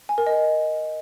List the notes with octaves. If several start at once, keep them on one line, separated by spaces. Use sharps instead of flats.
G#5
A#4
D#5